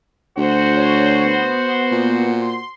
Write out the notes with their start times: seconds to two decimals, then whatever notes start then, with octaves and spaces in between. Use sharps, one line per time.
0.37 D2 F#4 C5
0.76 C#5
1.25 B3
1.92 A#2
2.42 C6